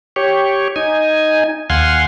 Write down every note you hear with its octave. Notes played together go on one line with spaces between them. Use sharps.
G4 C#5
D#4 G#5
D#2 F5 F#5 G#5 C6